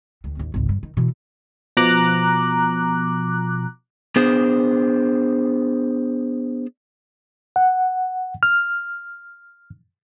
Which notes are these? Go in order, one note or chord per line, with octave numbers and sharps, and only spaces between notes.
D2 D#3
A1 D#2
G#1 C#2
G2
D#3
B2 E3
B2 F3 A#5 D6 F#6
B3 D4 G#4 C5
F#5
F6